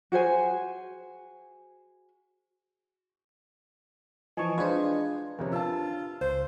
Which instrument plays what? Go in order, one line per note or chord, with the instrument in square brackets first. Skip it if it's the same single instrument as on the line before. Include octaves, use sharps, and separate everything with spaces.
[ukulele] F#4 G#4 C5 G#5
[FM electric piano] E3 F3 [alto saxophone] D#5 [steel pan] G#5 A5 C#6
[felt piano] G#3 G#6 [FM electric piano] D4 B4 [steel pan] F4 C5
[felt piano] F2 C3 C#4 [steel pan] A#4
[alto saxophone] F4 [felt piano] A5 E6
[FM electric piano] C#2 [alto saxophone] C5 [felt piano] C6